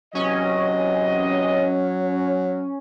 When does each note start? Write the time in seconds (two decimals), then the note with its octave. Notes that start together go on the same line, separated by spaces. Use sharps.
0.15 E2 C3 F#3 C#4 D#5